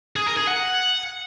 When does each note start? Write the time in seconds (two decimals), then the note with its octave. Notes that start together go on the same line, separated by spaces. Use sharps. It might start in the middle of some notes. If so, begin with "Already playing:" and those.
0.16 G#4
0.26 A#4
0.37 G#4
0.47 F#5